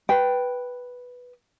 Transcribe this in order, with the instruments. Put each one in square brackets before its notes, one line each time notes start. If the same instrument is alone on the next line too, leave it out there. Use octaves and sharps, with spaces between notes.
[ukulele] B4 G5